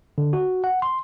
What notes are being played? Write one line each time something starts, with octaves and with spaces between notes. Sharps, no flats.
D3
F#4
F#5
C6